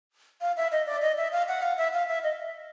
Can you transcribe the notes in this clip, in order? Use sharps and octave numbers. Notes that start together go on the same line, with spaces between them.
F5
E5
D#5
D5
D#5
E5
F5
F#5
F5
E5
F5
E5
D#5